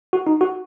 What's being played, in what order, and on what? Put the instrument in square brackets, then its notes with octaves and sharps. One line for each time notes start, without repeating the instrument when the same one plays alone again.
[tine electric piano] F#4
D#4
F#4